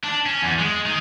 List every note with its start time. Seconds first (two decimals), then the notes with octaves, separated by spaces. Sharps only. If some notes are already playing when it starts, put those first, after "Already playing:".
0.04 D4
0.26 C#4
0.42 E2
0.59 G#3
0.86 D#3